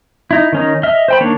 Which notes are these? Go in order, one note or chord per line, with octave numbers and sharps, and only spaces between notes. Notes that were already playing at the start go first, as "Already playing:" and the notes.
D#4 E4
D#3 C#4 D#4
D#5 E5 F6
C5 G5 B5
D#3 A#3 D4 C#5